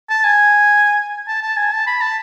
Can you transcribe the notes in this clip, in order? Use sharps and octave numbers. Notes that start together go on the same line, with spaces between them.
A5
G#5
A5
A5
G#5
A5
B5
A5